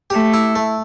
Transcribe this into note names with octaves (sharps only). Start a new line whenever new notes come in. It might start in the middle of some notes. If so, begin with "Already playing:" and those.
A3 G4
E4
A3